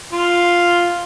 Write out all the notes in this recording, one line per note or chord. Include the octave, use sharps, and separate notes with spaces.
F4